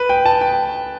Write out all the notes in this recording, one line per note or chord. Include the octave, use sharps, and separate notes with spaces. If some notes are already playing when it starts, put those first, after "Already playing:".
Already playing: B4
G5
A5
G5